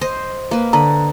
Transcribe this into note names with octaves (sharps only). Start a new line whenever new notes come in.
C5 D#5
A#3 B4
D3 D#5 A#5 B5